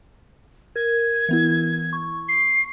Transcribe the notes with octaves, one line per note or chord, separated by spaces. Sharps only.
A#4 G#6
E3 B3 E4
C#6
C7